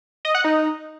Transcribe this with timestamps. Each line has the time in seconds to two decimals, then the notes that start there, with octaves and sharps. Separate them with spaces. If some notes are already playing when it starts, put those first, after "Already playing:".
0.25 D#5
0.35 F#5
0.44 D#4